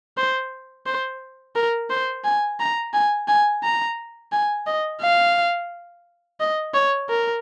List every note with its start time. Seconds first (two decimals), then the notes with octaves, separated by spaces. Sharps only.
0.17 C5
0.86 C5
1.56 A#4
1.90 C5
2.24 G#5
2.59 A#5
2.94 G#5
3.28 G#5
3.63 A#5
4.32 G#5
4.67 D#5
5.01 F5
6.40 D#5
6.74 C#5
7.10 A#4